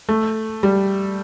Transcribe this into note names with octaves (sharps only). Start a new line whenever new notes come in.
A3
G3